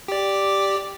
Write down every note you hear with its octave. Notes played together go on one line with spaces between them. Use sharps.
G4 D5